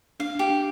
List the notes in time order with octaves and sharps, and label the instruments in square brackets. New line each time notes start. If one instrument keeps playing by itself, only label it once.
[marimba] D4 [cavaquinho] F5
[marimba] D4 [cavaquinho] G4
[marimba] D4